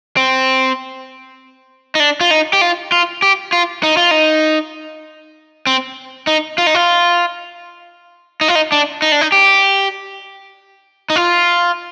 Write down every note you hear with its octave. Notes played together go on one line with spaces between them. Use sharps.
C4
D#4
D4
F4
D#4
G4
F4
F4
G4
F4
D#4
F4
D#4
C4
D#4
F4
D#4
F4
D#4
F4
D#4
D4
D#4
D4
D#4
G4
D#4
F4